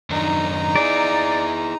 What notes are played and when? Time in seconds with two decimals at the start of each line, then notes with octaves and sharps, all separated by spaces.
0.10 F#2 D#3 D4 D#4 A#5
0.76 E4 G#4 D5